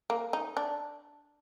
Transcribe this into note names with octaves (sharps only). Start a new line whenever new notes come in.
A#3
D#4
D4